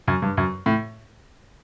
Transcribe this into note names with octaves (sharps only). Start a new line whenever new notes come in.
F#2
G2
F#2
A2